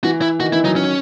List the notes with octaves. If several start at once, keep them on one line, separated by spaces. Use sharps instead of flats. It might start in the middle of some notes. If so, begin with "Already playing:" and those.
E3 F#4
E4
D#3 F#4
E3 E4
D#3 F#3 D#4
C#4